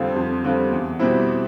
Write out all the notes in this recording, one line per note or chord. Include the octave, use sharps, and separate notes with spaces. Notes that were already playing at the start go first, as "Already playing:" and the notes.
Already playing: F2 D3 G3 C4 F4
F2
D3 G3 C4 F4
E2
B2 G3 C4 E4